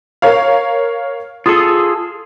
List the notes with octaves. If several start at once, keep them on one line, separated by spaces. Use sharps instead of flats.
A#4 C#5 F5
F4 G#4 A4 D#6